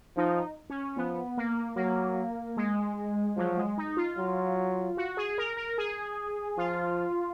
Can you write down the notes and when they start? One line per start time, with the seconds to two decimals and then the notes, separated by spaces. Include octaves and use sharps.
0.17 F3 D#4
0.70 C#4
0.97 F3 B3
1.37 A#3
1.76 F#3 A#3
2.57 G#3
3.37 F3 F#3
3.57 G#3
3.78 D#4
3.97 F4
4.18 F#3
4.97 F#4
5.17 G#4
5.38 A#4
5.57 A#4
5.78 G#4
6.58 F3 F4